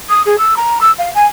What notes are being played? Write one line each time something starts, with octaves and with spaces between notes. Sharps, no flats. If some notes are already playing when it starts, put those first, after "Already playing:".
D#6
G#4
E6
A#5
E6
F5
G#5